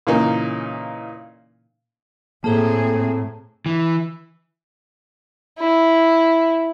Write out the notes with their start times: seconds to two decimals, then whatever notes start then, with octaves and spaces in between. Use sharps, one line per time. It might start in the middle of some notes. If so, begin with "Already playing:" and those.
0.07 A#2 C#3 E3 A#3 C#4 D#4
2.44 A2 A#3 C4 G#4 A4 C5 A5 A#5
3.66 E3
5.59 E4